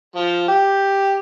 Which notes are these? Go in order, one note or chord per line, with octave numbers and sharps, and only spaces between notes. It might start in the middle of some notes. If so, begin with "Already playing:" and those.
F3
G4